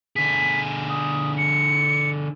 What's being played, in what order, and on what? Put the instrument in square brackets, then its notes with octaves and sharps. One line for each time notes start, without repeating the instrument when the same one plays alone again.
[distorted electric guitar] D3 G#4 [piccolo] B6
[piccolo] D#6
C#7